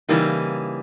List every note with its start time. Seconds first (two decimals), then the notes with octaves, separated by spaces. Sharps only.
0.09 C#3 E3 G3 A#3 D#4